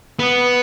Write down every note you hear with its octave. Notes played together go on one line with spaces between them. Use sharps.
B3